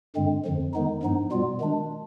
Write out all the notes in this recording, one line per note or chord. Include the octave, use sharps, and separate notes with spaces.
G2 D3 G#3 C4
F2 D3 F3
D#3 G#3 B3 D#4
G2 F3 B3 D#4
B2 G3 B3 F4
D#3 G#3 D4